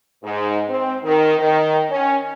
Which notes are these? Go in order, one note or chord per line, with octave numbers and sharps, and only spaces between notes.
G#2
C4
D#3
D#3
C#4